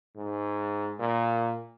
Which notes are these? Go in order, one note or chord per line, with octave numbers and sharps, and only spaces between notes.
G#2
A#2